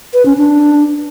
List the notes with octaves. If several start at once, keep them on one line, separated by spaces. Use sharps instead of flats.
B4
C#4
D4